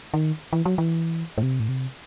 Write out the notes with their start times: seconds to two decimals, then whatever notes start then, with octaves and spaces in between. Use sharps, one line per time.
0.14 D#3
0.53 E3
0.65 F#3
0.78 E3
1.38 A2
1.43 C3
1.60 A2
1.69 C3